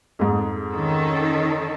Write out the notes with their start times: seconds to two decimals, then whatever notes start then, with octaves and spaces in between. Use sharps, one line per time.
0.19 F2 G#2
0.71 D#3 C#4 A4